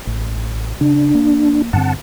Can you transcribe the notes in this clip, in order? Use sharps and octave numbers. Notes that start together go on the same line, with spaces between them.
A1
C#3 D4
A#3
G2 D3 C4 F#5 A5